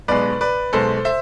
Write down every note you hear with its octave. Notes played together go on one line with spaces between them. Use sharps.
B1 B2 G#3 B4 D5
B4 D5
B1 B2 G#3 A4 C5
C5 E5